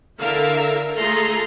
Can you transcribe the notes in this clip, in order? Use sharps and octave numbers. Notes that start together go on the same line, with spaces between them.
D3 E4 A#4 E5 F5
A3 F4 G#4 A4 A#5 C6